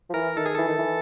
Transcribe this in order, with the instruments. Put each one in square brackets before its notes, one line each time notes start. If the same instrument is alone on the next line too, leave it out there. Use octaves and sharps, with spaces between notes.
[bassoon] F3
[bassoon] E3 [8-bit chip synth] A#4
[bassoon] D#3 [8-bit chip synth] A4
[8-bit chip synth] G#4
[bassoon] E3 [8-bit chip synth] A4
[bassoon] D#3
E3